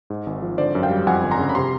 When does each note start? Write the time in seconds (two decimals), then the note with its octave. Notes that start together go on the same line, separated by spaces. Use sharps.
0.10 G#2
0.26 G#1
0.42 F3
0.58 D3 C5 D5
0.75 F#2
0.83 F5 G5
0.90 G3
1.07 F2 F#5 G#5
1.23 G1
1.31 A#5 C6
1.39 C#3
1.49 B5
1.55 C3 A#5 C6